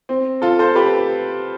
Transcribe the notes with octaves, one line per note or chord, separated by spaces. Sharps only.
C4
F4 A4
A4 C5
G4 B4